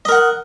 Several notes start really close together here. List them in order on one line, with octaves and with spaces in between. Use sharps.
D#5 A#4 F#5